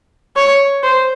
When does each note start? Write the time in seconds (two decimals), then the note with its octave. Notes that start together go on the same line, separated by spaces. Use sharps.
0.36 C#5
0.83 C5